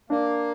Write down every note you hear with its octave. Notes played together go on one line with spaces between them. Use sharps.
A#3 D4